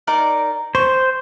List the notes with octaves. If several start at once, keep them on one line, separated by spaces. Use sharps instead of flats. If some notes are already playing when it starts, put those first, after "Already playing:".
D#4 A#4 D5
C5 C#6